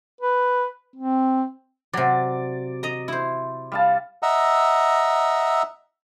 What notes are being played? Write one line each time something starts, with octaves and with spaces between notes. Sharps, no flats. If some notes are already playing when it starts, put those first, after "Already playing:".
B4
C4
C3 F#3 D5
D#5 A#5
E4 C5
G3 F5 A5
D#5 E5 F#5 A#5 E6